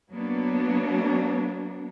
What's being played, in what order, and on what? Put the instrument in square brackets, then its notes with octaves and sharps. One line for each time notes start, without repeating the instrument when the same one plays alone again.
[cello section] F#3 A#3 B3 D4